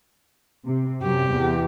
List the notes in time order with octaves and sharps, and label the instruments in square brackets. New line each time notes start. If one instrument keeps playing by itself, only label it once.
[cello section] C3
[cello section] F#2 C3 [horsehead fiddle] G4
[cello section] E2